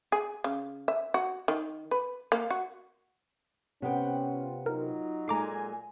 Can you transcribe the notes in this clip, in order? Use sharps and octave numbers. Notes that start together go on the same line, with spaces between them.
G#4
C#3
E5
F#4
D#3
B4
A#3
F#4
C3 B3 C#4 B4 C5 F#5 G5
F4
F#3 D#4 F4 A#4
A#2 F#3 G#3 A4 G#5 A#5 D6 C7